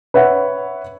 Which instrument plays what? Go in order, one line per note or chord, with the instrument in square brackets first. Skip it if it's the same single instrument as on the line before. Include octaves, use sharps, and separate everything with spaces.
[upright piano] B4 C#5 E5 F#5